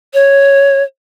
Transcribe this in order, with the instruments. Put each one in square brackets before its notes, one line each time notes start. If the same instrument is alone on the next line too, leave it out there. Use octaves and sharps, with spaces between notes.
[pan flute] C#5